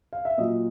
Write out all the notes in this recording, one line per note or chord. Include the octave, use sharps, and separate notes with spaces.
F5
E5
A#2 F#3 D#5